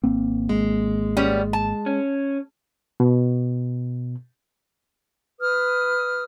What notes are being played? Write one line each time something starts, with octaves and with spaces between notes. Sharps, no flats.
G#1 A#3 C4
G#3
G3 B3 C#4
A5
C#4
B2
B4 D#6 F6